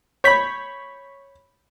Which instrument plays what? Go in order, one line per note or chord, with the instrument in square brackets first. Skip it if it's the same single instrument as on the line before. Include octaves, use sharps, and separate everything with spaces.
[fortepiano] C#5 B5 [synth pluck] G6 B6